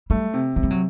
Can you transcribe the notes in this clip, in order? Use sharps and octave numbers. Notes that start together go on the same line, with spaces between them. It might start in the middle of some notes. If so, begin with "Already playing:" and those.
G3 A3
C3
C3 F#3
G3
F#3